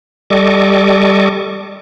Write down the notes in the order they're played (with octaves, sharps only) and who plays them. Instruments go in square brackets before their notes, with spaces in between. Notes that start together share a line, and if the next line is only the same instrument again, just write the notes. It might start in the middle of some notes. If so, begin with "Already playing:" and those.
[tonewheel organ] G3 A4 D#5 C#6 D6